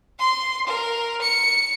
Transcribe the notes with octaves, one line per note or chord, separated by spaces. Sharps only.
C6
A#4
C#7